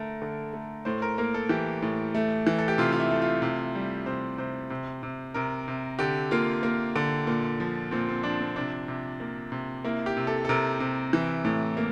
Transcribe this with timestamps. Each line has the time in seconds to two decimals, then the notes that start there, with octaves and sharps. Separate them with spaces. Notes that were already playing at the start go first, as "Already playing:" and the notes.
Already playing: D3 A3 A#4
0.22 D3
0.53 A3
0.85 A2 C5
1.02 A#4
1.18 A#3 A#4
1.34 A4
1.49 E3 G4
1.82 A2
2.15 A3
2.47 E3
2.58 A4
2.68 G4
2.78 C3 F4
2.92 F4
2.99 E4
3.11 A3
3.22 F4
3.42 C3
3.75 G3
4.06 C3 C5
4.38 C3 C5
4.70 C3
5.03 C3
5.34 C3 A#4
5.68 C3
5.99 D3 G4
6.31 A#3 F4
6.63 A#3
6.96 D3
7.27 A#2
7.60 F3
7.91 A#2 C4
8.08 C4
8.23 F3 D4
8.40 C4
8.56 C3 D4
8.88 C3
9.20 A#3
9.52 C3
9.85 A#3 E4
10.06 G4
10.17 C3
10.27 A4
10.45 A4
10.49 C3 A#4
10.80 C3
11.13 E3
11.45 A2
11.77 A#3